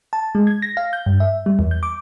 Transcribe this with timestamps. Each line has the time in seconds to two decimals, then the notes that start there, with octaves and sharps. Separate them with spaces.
0.13 A5
0.35 G#3
0.47 G#6
0.62 A#6
0.77 F5
0.93 G6
1.06 G2
1.20 E5
1.46 G3
1.59 E2
1.71 G6
1.83 D6